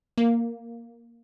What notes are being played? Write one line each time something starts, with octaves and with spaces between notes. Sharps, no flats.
A#3